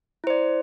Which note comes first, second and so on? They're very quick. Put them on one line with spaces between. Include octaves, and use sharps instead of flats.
E4 C5 D5